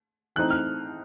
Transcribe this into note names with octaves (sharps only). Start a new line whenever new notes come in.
E3 A3 C4 D#4 F#6
F6